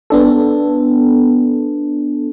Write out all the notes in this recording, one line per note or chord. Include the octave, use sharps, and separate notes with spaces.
B3 D4 A4